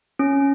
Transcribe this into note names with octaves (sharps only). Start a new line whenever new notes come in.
C#4